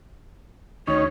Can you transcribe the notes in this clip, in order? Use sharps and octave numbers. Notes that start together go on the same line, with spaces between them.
D2 D#3 C#4 C#5